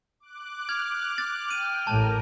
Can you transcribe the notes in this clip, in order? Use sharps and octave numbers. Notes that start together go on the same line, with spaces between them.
D6 F#6
F6 G#6
A6
G5 D#7
A1 A2 A#4 A5